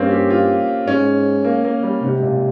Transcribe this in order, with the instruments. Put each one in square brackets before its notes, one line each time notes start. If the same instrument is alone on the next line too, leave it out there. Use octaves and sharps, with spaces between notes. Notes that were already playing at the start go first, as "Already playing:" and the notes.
Already playing: [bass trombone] G2 [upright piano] A#3 C4 C#4
[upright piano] G4
F4
[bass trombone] G#2 [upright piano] C#4
[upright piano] A#3
A#3
G3
[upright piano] G#2 [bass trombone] C3
[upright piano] A#2